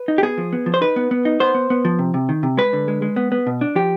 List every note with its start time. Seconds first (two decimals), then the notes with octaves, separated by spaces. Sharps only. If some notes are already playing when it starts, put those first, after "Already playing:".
Already playing: B4
0.08 D#4
0.18 G4
0.23 B3 G#4
0.38 F3
0.53 B3
0.66 F3
0.74 C5
0.81 D#4 B4
0.96 B3
1.11 B3
1.25 D#4
1.40 B3 C5
1.55 B3
1.70 B3
1.85 F3
1.99 C3
2.14 C3
2.29 D#3
2.43 C3
2.57 G#3 B4
2.73 D3
2.88 G#3
3.02 G#3
3.16 B3
3.32 B3
3.47 B2
3.61 D4
3.76 F3 G4